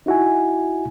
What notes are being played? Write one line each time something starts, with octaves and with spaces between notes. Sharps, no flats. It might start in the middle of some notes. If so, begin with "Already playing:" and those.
D#4 E4 F#4 E5 G#5